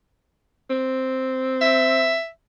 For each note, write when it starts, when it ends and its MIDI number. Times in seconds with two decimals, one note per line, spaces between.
0.70 2.17 60
1.61 2.28 76